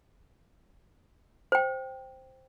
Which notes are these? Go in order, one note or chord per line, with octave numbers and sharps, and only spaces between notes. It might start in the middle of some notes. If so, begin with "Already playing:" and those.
C5 G5